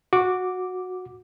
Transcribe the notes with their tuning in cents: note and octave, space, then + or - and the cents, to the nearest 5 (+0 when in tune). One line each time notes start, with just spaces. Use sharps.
F#4 -15 D6 -5